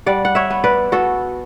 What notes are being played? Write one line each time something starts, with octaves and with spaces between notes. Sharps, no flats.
G3 D5 F#5
F#5
C#5 E5
B3
B4 D5
B3 F#4 A4